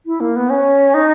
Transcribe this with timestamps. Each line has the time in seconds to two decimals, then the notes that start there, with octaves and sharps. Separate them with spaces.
0.06 E4
0.20 A#3
0.36 B3
0.50 C#4
0.94 D#4